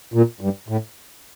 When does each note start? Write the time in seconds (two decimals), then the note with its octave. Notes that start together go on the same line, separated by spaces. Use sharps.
0.14 A#2
0.41 G2
0.69 A2